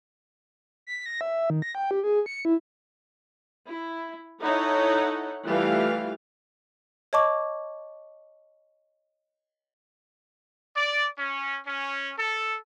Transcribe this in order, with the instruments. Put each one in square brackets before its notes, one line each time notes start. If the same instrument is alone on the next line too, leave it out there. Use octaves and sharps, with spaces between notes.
[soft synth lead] B6
A#6
E5
D#3
A#6
G5
G4
G#4
C#7
E4
[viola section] E4
D#4 E4 A4 C#5 F#5
E3 G3 A3 F4 F5
[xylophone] C#5 D#5 A5 C#6 D6
[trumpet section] D5
C#4
C#4
A4